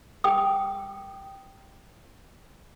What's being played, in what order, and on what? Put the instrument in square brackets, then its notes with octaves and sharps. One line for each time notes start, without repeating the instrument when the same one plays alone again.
[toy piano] G5 D#6